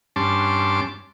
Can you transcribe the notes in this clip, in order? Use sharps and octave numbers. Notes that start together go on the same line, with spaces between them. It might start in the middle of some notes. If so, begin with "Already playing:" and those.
G2 C#4 A5 C6 D6